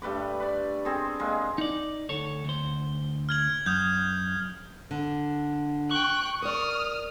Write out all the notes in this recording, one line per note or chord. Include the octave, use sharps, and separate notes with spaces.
G2 A3 B4 D6
B4 D5
C4 G#4 A4
G#3 A#3
D#4 D5
D2 A4 C#5
D2 C5
F6 G#6 F#7
F#2 D#6 G6
D3
G5 C#6 F#6
A#4 D5 D#6 F6